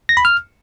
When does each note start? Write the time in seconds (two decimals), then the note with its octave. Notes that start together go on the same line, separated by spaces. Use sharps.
0.09 A#6
0.17 B5
0.25 F6